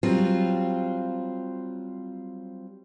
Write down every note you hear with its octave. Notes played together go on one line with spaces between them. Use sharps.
F#3 G3 C4 F4